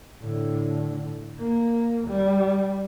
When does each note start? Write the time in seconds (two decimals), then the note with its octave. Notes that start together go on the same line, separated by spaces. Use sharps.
0.22 A2 D3
1.38 A#3
2.07 G3